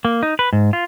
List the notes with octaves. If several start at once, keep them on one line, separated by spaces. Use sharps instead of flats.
A#3
D#4
B4
G#2
F4